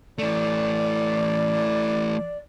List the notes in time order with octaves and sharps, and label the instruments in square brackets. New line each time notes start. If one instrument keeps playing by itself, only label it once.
[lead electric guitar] E3 A3 [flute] D5